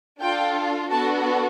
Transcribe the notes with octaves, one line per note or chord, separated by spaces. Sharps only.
D4 F4 A4 G5
B3 D4 F#4 A4 A5